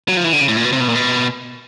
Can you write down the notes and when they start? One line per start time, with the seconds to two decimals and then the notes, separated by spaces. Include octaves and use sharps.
0.08 F#3
0.17 F3
0.24 E3
0.33 D3
0.41 C#3
0.48 A2
0.57 A#2
0.64 B2
0.73 C3
0.80 B2
0.88 A#2
0.95 B2